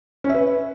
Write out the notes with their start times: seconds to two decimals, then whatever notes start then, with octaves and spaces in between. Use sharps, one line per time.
0.24 C#4
0.29 E5
0.34 B4